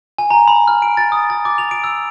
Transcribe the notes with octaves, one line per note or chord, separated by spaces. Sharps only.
G#5
A#5
B5
F6
D7
A6
D#6
A6
D6
F7
D7
E6